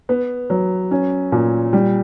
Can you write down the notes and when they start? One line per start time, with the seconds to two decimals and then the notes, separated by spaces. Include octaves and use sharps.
0.09 B3
0.50 F#3
0.91 C#4
1.32 A#2
1.73 G3